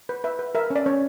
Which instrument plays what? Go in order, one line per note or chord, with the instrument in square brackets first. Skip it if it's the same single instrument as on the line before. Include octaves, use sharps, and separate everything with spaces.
[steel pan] B4
B4 E5
B4
A#4 E5
C#4
D5
C#4 C#5